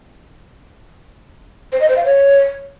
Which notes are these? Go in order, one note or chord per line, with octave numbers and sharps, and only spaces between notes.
C5
D#5
C5
F5
C#5